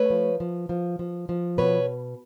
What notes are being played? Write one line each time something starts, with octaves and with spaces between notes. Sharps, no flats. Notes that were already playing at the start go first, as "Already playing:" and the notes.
Already playing: A3 B4 C#5
F3
F3
F3
F3
F3
B2 B4 C#5